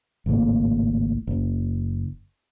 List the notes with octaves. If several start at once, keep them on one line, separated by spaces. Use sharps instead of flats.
G#1 C#2 A2 A#3
F#1